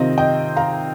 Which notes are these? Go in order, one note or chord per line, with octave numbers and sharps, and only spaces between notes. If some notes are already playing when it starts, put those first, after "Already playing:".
Already playing: C3 D#3 C4 F4 D#5
D#5 G5
F5 A#5